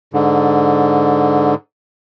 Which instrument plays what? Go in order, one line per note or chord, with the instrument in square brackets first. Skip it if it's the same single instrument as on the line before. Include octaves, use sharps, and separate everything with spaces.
[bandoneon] G#2 D3